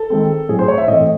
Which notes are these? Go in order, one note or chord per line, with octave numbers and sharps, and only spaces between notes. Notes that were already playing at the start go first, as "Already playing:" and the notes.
Already playing: A4
D#3 G#3 C4
A2 F#3 C4 G#4
C5
C#5
E5
A2 E3 A3 C4 D#5